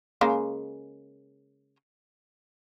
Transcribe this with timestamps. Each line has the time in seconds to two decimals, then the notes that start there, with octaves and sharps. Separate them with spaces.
0.21 C#3 G#3 A#3